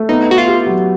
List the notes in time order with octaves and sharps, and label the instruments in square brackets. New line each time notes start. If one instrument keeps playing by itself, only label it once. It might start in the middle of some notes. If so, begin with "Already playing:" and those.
Already playing: [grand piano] A3
[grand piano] B3 [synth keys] D#4
[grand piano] E4 [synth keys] F#4
[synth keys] F4
[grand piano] G4
F#3